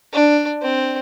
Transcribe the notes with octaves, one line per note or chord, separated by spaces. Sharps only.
D4
C4